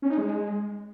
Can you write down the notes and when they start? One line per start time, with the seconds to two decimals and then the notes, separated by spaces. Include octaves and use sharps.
0.02 C#4
0.10 D#4
0.18 G#3